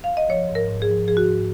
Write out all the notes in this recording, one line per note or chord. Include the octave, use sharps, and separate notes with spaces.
F5
D#5
F3 C#5
G#2
A#4
G#2
G#4
F3
F3 G#4
F#4
G#2 G#4